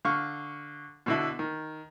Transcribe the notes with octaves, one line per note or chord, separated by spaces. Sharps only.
D3 F5 C#6
B2 D3 E4
D#3